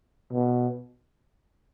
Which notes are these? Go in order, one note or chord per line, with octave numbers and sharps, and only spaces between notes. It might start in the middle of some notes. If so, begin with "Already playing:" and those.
B2